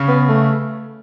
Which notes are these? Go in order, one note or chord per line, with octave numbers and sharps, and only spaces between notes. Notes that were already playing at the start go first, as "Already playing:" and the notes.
Already playing: C#3 C#4
B3
A3